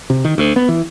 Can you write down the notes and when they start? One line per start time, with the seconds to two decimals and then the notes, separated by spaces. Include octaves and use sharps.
0.10 C3
0.25 D#3
0.38 D2
0.56 B3
0.69 E3